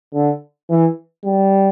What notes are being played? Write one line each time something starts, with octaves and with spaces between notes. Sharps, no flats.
D3
E3
G3